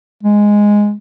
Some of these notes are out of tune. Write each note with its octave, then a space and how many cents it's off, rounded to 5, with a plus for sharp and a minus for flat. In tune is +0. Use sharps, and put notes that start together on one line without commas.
G#3 -5